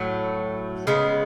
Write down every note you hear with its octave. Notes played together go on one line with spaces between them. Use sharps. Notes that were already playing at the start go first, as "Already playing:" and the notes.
Already playing: A2 F#3 A3
C#3 G#3 B3